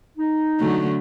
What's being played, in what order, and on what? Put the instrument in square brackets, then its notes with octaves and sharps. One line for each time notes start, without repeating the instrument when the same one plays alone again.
[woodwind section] D#4
[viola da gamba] D3 F#3 A3